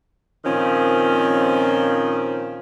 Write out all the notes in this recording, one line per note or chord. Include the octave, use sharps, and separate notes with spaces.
A#2 D#3 F3 C4 C#4